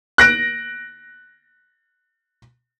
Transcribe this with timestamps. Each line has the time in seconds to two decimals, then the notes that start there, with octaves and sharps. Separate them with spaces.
0.18 F#6 A#6 D7